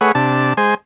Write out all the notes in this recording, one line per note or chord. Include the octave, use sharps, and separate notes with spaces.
A3 G#4 B4 C#5 F#5
C3 D4 A5
G#3 C5 G#5